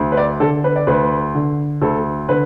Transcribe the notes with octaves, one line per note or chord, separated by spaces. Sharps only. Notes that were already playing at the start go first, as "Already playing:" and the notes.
Already playing: D2
B4
D5
D3 A4
B4
D5
D2 B4
D3
D2 A4
D3 B4